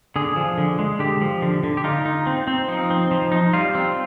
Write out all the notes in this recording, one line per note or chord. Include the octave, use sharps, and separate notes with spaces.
D3 G#4
F3
D3
G#3
D3 G4
F3
D3
D3
G4
D#4 F4
D#4
C4
C4
F3 D#4
C4
F3
D#4
G3 F4
C4